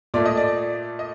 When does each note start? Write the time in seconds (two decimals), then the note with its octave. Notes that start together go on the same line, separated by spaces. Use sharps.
0.14 A#2 A3 D5
0.25 D#5
0.37 D5
0.99 D#5